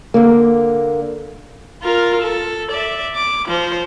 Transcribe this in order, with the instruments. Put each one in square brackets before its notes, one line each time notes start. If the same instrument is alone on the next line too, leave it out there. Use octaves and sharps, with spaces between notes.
[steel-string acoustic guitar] D3 A#3
[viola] F4 A#4
A4
D5 E5
D6
F3 C5